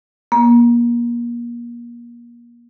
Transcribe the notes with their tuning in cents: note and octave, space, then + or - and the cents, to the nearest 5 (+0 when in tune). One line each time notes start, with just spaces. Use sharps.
A#3 +30